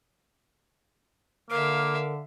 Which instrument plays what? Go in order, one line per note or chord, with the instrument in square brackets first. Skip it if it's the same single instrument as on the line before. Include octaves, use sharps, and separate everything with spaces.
[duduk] D3 [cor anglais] A#3 [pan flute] A#4 [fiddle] E5 F5